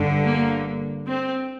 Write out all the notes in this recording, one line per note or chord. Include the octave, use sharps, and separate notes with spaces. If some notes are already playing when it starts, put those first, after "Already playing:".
Already playing: G1 G2 D3
A#3
C4